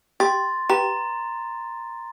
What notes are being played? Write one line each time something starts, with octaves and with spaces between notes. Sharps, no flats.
G4 C6 A6
G4 B4 A#5